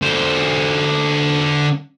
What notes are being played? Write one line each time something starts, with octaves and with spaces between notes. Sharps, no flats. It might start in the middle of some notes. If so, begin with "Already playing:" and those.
D3 C5